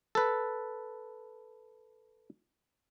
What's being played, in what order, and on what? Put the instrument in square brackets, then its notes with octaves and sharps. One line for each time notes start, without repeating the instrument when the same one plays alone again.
[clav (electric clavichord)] A4 B4